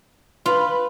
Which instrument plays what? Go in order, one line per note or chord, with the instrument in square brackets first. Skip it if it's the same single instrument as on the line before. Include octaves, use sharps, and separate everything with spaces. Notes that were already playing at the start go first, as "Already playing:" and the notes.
[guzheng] F4 [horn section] B4